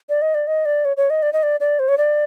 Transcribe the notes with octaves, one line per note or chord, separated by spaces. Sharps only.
D5
D#5
D5
D#5
D5
C#5
C#5
D#5
D5
D#5
D5
D5
C5
C#5
D5